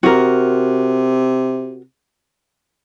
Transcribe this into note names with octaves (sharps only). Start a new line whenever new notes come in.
C3 F#4 A#4